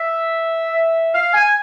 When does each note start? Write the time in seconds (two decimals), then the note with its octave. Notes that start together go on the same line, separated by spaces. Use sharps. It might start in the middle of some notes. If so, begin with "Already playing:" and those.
Already playing: E5
1.13 F5
1.33 G#5